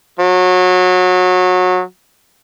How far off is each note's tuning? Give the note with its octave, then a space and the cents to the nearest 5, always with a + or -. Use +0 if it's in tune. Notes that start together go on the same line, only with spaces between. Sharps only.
F#3 -25